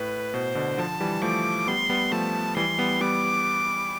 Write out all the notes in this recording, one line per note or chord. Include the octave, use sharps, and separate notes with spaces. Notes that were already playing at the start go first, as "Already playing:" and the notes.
Already playing: A2 B4
B2 C5
B2 D3
D3 F3 A5
E3 G3
F3 A3 D6
G3 B3 C6
G3 B3
F3 A3 A5
E3 G3 C6
G3 B3
G3 B3 D6